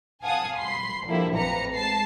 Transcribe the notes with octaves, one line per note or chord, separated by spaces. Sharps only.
F5 F#5 G#5 A5 D#6
B5 C6 C7
D3 F3 G3 A#3 E4
A1 F2 B4 A#5 C#7
G#3 A5 C7